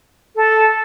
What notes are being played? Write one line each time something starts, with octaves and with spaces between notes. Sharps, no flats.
A4